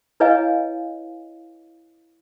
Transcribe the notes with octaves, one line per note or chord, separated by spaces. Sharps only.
E4 B4 C#5 D#5 F5 G#5